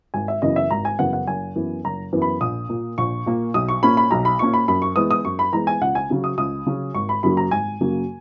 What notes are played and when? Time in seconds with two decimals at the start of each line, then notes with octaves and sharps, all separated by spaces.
0.14 G#1 G#5
0.28 E5
0.42 F#2 C#3 E3 B3 D#5
0.56 E5
0.71 G#1 A#5
0.85 G#5
0.99 F#2 C#3 E3 B3 F#5
1.13 F#5
1.27 F#1 G#5
1.56 F#2 E3 B3
1.84 F#1 A#5
2.13 F#2 E3 B3
2.22 B5
2.41 A#1 D#6
2.69 A#2 A#3
2.98 A#1 C#6
3.26 A#2 A#3
3.54 B1 D#6
3.68 C#6
3.82 A#2 A#3 C#4 B5
3.97 B5
4.11 B1 A#5
4.25 B5
4.39 A#2 A#3 C#4 C#6
4.54 B5
4.68 F#2 B5
4.82 C#6
4.96 E3 G#3 B3 D#6
5.11 D#6
5.25 F#2 C#6
5.39 B5
5.52 E3 G#3 B3 A#5
5.67 G#5
5.81 C#2 F#5
5.95 G#5
6.10 C#3 F#3 C#4
6.24 D#6
6.38 C#2 D#6
6.66 C#3 F#3 C#4
6.95 G#1 C#6
7.09 B5
7.23 F#2 C#3 F#3 A#3 B5
7.37 A#5
7.51 G#1 G#5
7.80 F#2 C#3 F#3 A#3